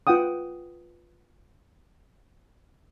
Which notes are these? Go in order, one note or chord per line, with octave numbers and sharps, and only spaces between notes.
F4 B4 F#5 G5 D#6